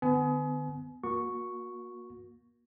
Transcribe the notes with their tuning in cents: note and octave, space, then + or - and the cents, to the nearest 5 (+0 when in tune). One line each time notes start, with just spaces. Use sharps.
D3 +40 B3 +30 G#5 +40
A#3 +30 F#4 -30 C#6 +0